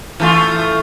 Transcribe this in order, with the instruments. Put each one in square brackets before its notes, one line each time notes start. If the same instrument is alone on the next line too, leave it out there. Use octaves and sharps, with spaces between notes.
[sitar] E3 A3 F4